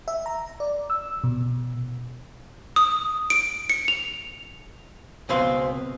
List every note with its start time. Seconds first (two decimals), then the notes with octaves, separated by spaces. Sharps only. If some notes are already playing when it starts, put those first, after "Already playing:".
0.08 E5
0.26 A#5
0.60 D5
0.90 E6
1.24 B2
2.76 D#6
3.30 D7
3.70 C#7
3.88 F7
5.29 C#2 B2 C4 C5 F5 C6